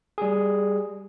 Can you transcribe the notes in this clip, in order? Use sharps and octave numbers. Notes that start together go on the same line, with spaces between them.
G3 G#4